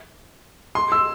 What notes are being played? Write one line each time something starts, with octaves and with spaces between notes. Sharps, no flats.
C6
E6